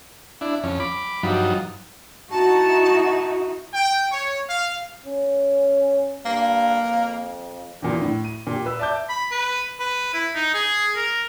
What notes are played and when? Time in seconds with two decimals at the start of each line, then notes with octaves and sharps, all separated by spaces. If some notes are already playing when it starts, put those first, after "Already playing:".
0.41 D4 E4
0.63 F2 C#4
0.80 B5 D6
1.23 G2 F3 F#3 D#4
2.31 D#4 E4 F#4 A5
3.73 G5
4.12 C#5
4.48 F5
5.06 C#4
6.26 G2 A#3
6.86 F2
7.82 E2 A#2 E3
8.02 A2
8.24 D#7
8.47 A#2 G4
8.66 B4 E6
8.79 D5 E5 A5 D6 G6
9.09 B5
9.31 B4
9.80 B4
10.14 E4
10.35 D#4
10.54 G#4
10.96 A#4